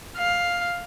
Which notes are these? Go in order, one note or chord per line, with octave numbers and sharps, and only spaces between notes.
F5